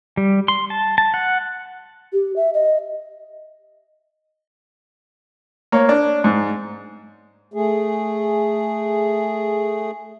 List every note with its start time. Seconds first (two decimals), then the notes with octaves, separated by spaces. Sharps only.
0.17 G3
0.48 C6
0.70 A5
0.98 A5
1.14 F#5
2.13 G4
2.36 E5
2.54 D#5
5.72 A#3 C#5
5.89 D4
6.24 G#2
7.54 A3 G#4